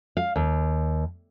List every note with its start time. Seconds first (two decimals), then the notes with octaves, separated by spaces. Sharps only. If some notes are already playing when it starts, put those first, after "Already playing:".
0.17 F5
0.36 D#2